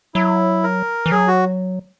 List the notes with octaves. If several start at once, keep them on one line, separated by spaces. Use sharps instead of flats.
F#3 E4
A#4
E3
F#3 G#4
F#4